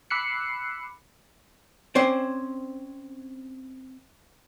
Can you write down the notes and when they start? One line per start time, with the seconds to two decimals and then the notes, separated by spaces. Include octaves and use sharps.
0.10 B5 D6 E6 F#6 C7 C#7
1.95 C4 C#4 C5 D5